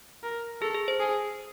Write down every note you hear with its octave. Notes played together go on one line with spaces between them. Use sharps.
A#4
G#4 A4
G#4
C5
G#4